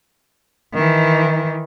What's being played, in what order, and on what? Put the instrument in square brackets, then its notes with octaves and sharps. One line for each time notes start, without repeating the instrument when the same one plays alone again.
[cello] D#3 E3